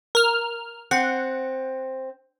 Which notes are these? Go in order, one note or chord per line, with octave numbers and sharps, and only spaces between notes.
A#4 F6
C4 F#5